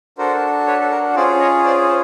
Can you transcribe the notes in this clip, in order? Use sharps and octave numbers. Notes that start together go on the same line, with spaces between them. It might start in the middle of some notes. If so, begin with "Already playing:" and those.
D4 F#4 A4 A#4 C5
B4 C#5
A4
A#4
C#4 F4 G#4 C5 D5
C#5 D#5
C5 D5
C5